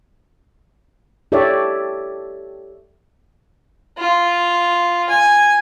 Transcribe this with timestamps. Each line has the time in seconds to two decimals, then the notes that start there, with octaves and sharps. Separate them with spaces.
1.32 G4 A4 C#5 D5 E5
3.98 F4
5.10 G#5